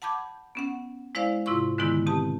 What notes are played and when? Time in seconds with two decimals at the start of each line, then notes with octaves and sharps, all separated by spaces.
0.02 F#5 A5 B5 D6 G6 G#6
0.55 B3 C#4 F#5
1.15 G#3 E4 C5 D5 F5
1.46 G#2 C3 E4 F4 C6 C#6
1.78 G#2 D3 D#3 G#3 B3 E4
2.06 B2 C4 G4 A5